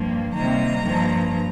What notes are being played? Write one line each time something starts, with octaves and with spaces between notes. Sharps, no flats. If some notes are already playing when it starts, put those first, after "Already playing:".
Already playing: G2 F3 A#3
C3 D#3 G3 A#3 A#5
G2 F3 A#3